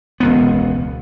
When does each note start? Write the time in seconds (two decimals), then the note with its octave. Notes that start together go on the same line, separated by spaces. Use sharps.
0.20 E1 C#2 B3